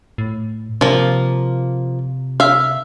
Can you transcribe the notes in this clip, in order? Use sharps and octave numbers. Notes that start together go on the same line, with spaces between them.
A2
C3 F3 A#3
E5 F5